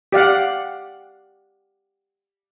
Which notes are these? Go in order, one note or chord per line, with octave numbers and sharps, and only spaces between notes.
G4 D5 F5 F#5